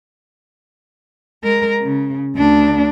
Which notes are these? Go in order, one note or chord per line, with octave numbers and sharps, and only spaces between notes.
G#3 A#4
C#3
D2 D4